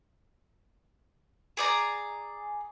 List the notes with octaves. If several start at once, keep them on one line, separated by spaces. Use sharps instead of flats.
G#4 D5 A#5